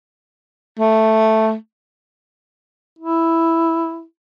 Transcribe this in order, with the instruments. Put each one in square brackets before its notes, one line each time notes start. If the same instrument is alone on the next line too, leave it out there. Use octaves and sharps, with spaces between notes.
[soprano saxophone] A3
[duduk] E4